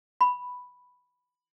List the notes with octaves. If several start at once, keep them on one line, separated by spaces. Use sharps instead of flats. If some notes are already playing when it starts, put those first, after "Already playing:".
B5